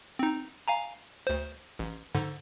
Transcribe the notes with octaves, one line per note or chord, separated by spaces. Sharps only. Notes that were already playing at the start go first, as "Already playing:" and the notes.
C4 D#4
F5 G#5 A#5
D2 C5
A1
G#2 D3